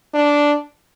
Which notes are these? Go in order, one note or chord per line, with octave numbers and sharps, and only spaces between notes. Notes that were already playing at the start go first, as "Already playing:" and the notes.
D4